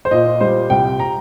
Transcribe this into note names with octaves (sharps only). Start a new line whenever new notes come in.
C5
A#2 D#5
G3 C5
C2 G5
A#5